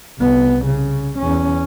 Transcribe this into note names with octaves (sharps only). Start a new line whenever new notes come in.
C2 B3
C#3
E2 C#4